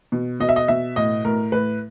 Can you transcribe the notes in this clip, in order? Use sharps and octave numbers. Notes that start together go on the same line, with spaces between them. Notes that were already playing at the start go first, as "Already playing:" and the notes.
B2
B2 D#5
E5
D#5
B2 E5
A2 D#5
A2 A#4
A2 B4